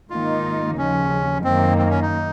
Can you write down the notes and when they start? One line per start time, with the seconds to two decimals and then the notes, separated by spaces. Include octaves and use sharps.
0.10 G#2 D#3 A#3 D#4 F4
0.78 D#2 C#3 F3 C#4
1.44 F#2 D#3 A#3 C4
1.78 C4
1.90 C#4
2.02 D#4